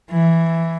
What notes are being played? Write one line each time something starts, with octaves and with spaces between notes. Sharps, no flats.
E3